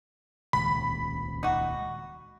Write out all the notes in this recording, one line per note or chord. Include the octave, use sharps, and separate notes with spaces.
D#1 C#2 B5
D#4 F#4